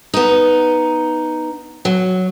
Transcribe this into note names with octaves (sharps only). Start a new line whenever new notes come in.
B3 D#4
F#3